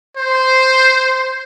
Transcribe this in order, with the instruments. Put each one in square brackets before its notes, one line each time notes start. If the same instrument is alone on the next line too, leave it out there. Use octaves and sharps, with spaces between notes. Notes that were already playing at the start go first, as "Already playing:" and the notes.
[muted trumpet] C5